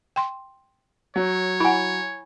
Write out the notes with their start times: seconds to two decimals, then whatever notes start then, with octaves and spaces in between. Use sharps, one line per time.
0.16 G5 C6
1.16 F#3 C#5
1.60 E4 F#5 G#5 B5